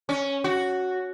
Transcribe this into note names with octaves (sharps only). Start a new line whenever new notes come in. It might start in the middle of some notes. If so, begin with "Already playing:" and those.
C#4
F#4